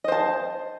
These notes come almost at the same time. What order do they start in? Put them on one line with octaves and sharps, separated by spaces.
D#5 C5 A5